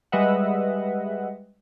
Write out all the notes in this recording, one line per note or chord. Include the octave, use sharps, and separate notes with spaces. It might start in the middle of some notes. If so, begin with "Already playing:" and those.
G3 G#3 B4 D#5 E5 F#5